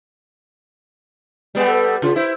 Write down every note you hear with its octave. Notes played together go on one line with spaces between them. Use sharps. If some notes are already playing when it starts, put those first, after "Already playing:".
G3 G#3 B3
A4
C#3 F4
E4 C5